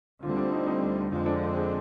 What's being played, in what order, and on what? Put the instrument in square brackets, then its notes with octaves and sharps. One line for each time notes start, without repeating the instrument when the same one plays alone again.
[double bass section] D2 D3 G3 C4 [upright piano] F4
[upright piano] D4
D#4
D#4
[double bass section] F2 D3 G#3 C4 [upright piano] F4
[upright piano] D4
F4
G#4